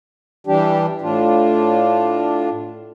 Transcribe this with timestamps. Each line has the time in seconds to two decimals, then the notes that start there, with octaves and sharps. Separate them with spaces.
0.47 E3 G3 D4 G4
1.02 A2 D4 F4